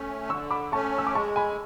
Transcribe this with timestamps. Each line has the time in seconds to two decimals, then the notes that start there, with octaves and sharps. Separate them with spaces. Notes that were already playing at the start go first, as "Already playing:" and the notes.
Already playing: A3 C#4
0.30 D3 C#6 E6
0.51 B5 D6
0.72 A3 C#4 A5 C#6
0.98 E6
1.07 D6
1.14 G#3 A5 C#6
1.36 G#5 B5